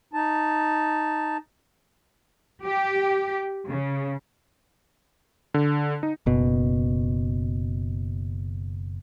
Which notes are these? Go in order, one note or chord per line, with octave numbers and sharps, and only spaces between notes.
D#4 A5
G4
C#3
D3
D#4
F#1 B2